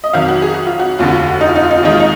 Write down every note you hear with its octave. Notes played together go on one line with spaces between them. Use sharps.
D#5
F2 D#3 F#3 F5
F#4
G#4
F#4
F4
F#4
F1 D#2 D3 F4
F#4
F4
F#4
D#4
F4
D#4
F4
D#4
F4
D#2 D#3 G#3 D#4
F4
D#4